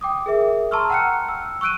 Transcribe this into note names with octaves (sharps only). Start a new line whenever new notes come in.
G5 D6 D#6
G#4 A#4 E5
A5 A#5 C6 C#6 E6 F6
F#5 G5 A#5 F6 F#6 C#7
E6
C#6 E6 F#6 D7 D#7